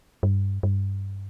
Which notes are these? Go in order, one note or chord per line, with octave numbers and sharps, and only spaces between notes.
G2
G2